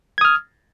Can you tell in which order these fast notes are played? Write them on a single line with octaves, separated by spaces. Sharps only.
G#6 D#6 F6